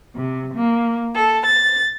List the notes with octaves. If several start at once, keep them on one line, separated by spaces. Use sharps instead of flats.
C3
A#3
A4
A6